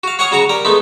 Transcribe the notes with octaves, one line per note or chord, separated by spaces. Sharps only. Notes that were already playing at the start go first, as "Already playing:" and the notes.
F#4 F5
C#5 F5 F#5 G#5 C#6 D#6
C#3 F#3 F#4 F#5 A#5 C#6
G3 A#4 A#5
G#3 A3 B3 D#4